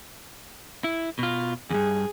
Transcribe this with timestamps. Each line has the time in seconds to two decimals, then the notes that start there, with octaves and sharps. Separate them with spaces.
0.84 E4
1.19 B2 F4
1.70 E2 G2 G#4